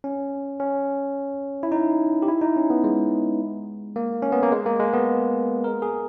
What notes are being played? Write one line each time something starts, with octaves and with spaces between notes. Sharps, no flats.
C#4
C#4
E4
D#4
G4
E4
D#4
C#4
B3
G#3
A#3
C#4
B3
A#3
G#3
A#3
G#3
B3
A#4
G#4